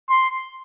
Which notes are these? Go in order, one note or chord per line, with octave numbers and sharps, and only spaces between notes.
C6